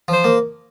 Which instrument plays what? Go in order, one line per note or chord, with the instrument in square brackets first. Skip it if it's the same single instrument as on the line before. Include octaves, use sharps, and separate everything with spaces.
[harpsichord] F3 [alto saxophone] C5
[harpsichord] A#3